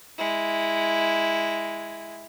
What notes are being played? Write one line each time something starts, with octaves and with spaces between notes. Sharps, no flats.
G#3 E4